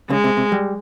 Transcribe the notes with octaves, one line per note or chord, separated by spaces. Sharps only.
C#3 G#3
C3
C3
G3